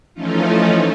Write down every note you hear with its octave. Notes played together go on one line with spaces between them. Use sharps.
E3 F3 A3 C#4 D#4 F4